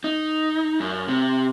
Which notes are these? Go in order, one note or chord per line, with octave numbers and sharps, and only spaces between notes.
D#4
F#2
C3